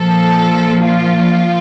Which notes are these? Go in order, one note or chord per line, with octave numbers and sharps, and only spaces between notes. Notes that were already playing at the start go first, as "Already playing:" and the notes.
Already playing: A#2 F3 A4
F4